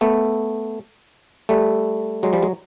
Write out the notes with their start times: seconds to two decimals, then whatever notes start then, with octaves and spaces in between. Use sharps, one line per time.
0.01 A3 B3
1.49 G3 A3
2.23 F#3 G#3
2.33 F3 G3
2.42 F#3 G#3